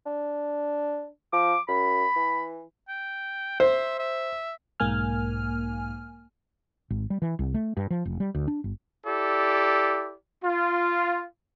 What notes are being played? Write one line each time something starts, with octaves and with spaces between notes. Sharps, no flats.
D4
F3 D6
F#2 B5
E3
G5
C5 E5
E5
B1 G#2 A#3 G#5 F6
G#1
G3
E3
C2
A3
G2
F3
F1
G3
D2
D4
G1
E4 G4 A4 D5
F4